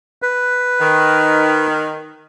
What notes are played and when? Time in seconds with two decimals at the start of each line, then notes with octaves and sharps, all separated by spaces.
0.22 B4
0.80 D#3